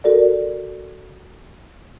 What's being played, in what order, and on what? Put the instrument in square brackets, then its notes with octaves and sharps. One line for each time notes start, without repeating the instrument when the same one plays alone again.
[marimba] F#4 A4 A#4 D5